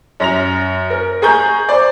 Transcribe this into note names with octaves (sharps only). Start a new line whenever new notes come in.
F#2 A#6 F7
A#4
G#4 G#5 A#5 C#6 G6 G#6
C5 D5